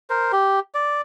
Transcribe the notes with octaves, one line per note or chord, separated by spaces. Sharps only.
A#4 C5
G4
D5